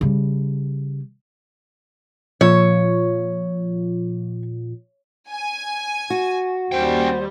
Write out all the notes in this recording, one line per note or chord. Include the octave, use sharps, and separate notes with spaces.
C#3 G3
A#2 F3 F4 C#5
G#5
F#4
D#2 G3 C#4 C5 G5